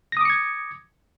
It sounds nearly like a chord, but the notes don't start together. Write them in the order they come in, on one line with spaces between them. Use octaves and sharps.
A#6 D#6 D6 C#7 G#6